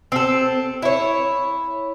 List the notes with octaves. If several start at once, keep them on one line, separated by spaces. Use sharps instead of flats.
C4 A4
E4 C#5